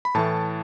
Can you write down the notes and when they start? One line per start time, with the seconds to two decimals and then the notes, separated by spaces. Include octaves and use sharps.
0.05 B5
0.15 A2 E3 A3 A5